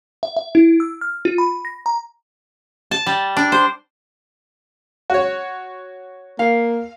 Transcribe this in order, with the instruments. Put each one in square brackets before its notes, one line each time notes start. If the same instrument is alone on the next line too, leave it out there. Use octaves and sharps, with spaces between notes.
[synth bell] E5
E5
E4
E6
F6
F4
B5
A#6
A#5
[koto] A5
G3
D4
C5
[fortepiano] F#4 C#5
[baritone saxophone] A#3 [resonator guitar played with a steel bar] F5